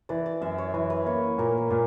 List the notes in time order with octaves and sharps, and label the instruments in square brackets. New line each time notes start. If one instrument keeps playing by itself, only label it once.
[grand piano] E3 [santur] D5
[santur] D5
[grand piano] F#2 [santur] E5
[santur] C#5
[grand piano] E3 [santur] B4
[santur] B4
[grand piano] A#3 [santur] C#5
[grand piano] A#2 [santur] A#4
[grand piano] A#2 [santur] A#4